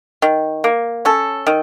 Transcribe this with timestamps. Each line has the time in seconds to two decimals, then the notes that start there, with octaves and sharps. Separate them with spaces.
0.22 D#3
0.64 A#3
1.05 C#4 A4
1.47 D#3